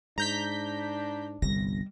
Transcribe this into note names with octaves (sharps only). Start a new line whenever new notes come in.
G#2 D4 A#5 G6 B6
G1 C2 G3 A#6